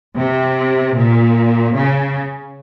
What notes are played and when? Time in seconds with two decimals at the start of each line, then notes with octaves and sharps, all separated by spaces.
0.17 C3
0.96 A#2
1.75 C#3